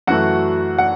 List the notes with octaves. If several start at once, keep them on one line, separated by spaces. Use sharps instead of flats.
F#2 E3 A3 F#4 F#5
F#5